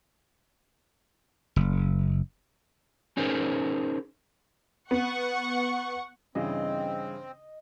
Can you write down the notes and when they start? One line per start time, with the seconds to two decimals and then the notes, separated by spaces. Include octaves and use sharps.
1.56 F#1
3.17 C#4 D#4 G#4 A#4 C5
4.91 B3 F#5 C#6
6.35 G2 C#3 E3 C4 D#5